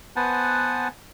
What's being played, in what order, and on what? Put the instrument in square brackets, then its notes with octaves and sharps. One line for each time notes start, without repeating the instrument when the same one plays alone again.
[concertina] B3 B4 C5 F#5 G#5 A5